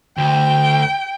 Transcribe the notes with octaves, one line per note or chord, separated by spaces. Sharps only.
D2 G5